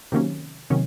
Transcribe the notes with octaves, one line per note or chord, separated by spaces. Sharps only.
C3 D#3 F#3 A#3 C#4
C3 D#3 F#3 A#3 C#4